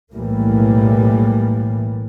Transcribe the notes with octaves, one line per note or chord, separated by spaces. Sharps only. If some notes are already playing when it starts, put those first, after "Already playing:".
B1 A2 E3 G3 A#3